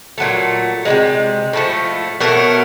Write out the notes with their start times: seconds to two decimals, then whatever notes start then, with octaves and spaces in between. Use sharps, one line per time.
0.18 A#2 F#3 A3
0.85 E3 G#3
0.90 C3
1.53 A2 F3 A3
2.20 B2 F#3 A3 A#4